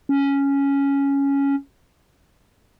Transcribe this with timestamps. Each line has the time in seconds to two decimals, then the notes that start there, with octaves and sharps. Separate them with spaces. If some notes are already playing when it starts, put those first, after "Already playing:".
0.09 C#4